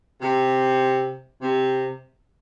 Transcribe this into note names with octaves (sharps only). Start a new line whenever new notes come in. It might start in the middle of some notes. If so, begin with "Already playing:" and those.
C3
C3